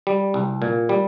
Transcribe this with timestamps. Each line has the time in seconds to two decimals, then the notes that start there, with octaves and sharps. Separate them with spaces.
0.07 G3
0.34 C2
0.62 A#2
0.89 G3